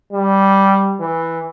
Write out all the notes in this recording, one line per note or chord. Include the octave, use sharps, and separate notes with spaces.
G3
E3